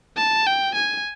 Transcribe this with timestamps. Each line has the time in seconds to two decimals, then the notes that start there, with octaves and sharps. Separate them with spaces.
0.17 A5
0.47 G5
0.75 G#5